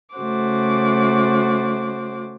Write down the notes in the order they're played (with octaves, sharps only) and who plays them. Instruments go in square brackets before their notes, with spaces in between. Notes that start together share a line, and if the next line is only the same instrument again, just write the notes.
[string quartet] C#3 A3 F#4 C5 D6